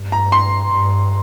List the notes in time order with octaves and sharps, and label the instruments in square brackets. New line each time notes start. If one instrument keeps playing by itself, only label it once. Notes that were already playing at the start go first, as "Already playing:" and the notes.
Already playing: [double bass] G2
[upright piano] A#5
C6
[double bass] G2